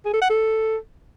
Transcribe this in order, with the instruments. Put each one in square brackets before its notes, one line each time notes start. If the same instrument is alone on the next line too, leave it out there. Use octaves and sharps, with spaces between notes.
[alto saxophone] G#4
A4
F#5
A4